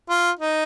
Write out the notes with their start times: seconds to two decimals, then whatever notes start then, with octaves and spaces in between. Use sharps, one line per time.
0.10 F4
0.39 D#4